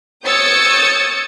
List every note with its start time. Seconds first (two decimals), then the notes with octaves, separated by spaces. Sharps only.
0.25 C#5 D#6 E6 G6 A6 C#7